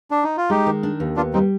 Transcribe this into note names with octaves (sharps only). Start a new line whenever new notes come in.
D4
D#4
F4
G#3 D#4 G4
D#3
D4
D#2
B3 D4 F4
G3 C4 D#4